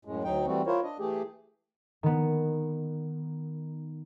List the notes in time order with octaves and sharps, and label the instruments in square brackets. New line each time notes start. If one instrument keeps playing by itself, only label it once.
[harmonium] F#2 A2 G#3
D2 F#3 D#4 G5
E3 G3 A3 C4 F#4
E4 F4 A#4 C5 C#5
D4 D#5
E3 A3 G4 G#4
[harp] D#3 B3